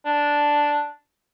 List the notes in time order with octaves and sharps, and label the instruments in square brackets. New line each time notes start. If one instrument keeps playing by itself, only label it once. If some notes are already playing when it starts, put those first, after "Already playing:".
[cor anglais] D4